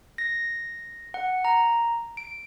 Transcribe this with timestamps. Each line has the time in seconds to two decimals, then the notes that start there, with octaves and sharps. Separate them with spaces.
0.18 A#6
1.14 F#5
1.45 A#5
2.17 D7